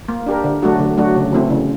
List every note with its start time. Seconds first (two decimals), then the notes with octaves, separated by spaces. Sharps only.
0.08 A#3
0.26 D4 G4 A#4
0.44 D3
0.63 F#3 A3 D4 F#4
0.79 D3
0.97 F#3 A3 D4 F#4
1.16 C#3
1.32 E3 A3 C4 E4
1.50 C#3